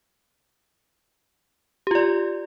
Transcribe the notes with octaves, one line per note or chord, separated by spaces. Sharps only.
F4 G4 D5